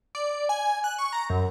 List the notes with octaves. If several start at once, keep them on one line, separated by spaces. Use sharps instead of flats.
D5
G#5
F#6
C#6
A#5
F#2